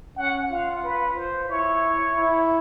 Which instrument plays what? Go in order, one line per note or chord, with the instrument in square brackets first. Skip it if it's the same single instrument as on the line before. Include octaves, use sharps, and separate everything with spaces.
[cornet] C#4 [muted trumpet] F#5
[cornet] F4 [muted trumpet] F5
[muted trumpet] B4
C5
[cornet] E4 [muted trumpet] C#5
[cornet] E4